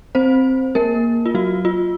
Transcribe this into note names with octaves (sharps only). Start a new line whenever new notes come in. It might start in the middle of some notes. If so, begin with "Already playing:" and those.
C4 C5
A#3 A#4
F4
F#3 F#4
F4